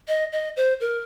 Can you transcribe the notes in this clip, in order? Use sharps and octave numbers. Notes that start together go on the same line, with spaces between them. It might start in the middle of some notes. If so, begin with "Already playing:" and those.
D#5
D#5
C5
A#4